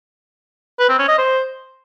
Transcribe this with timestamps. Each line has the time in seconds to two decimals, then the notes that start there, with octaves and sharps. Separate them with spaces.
0.79 B4
0.89 C4
0.99 C#4
1.08 D#5
1.18 C5